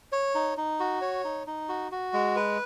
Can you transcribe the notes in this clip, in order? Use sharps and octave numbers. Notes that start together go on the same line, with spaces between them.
C#5
D#4
D#4
F#4
C#5
D#4
D#4
F#4
F#4
G#3
B4